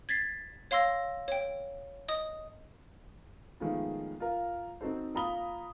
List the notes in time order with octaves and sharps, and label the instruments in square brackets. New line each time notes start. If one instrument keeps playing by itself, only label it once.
[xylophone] G#6 A6 B6 C7
C#5 F5 C6 E6 A#6
C#5 G5
D#5 D#6
[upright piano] D#3 F3 G#3 A3 B3 F4
F4 A#4
C4 D#4 F#4 A4 C5
A#3 F4 A#5 B5 D#6 G7